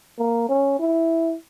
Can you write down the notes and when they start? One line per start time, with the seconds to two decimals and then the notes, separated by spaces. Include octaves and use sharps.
0.18 A#3
0.49 C#4
0.79 E4